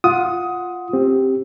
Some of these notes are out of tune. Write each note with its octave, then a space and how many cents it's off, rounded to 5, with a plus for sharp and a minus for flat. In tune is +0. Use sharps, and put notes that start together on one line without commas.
F4 +0 F#5 -10 D#6 +15
C4 +15 G4 +0